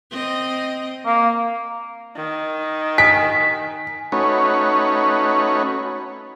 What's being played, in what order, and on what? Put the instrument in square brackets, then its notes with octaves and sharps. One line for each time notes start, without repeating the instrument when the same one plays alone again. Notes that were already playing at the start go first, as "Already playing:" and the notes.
[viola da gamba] C4 D#5
[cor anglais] A#3
[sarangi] D#3
[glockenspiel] G#5 [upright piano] B6
[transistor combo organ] A3 C#4 D#4 F#4 B4 C#5